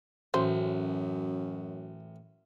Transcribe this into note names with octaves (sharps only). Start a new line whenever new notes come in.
A1 F#2 F#4 C5